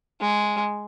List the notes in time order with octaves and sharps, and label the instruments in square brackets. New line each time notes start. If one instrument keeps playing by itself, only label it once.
[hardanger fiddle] G#3